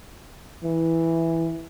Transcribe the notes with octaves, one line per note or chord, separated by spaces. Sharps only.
E3